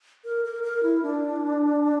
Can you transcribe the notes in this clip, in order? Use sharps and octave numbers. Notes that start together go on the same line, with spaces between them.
A#4
A#4
A#4
E4
D4